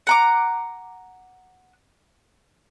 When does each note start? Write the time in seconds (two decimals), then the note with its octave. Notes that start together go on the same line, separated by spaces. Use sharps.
0.07 F#5 A#5 D6